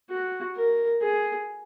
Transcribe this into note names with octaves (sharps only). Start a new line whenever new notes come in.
F#4
A#4
G#4